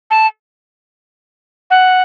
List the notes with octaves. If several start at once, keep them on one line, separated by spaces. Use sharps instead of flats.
A5
F#5